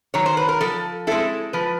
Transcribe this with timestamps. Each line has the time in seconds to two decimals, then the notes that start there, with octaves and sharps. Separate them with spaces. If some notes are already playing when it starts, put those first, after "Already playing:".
0.14 D#3 F#3 C#5
0.26 C5
0.37 B4
0.49 A#4
0.61 F3 A4
1.07 G#3 C4 E4 A4
1.53 F3 B4